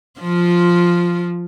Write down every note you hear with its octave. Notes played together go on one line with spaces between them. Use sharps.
F3 F4